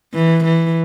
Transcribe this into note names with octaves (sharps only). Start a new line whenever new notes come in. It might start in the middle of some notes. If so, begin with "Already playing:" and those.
E3
E3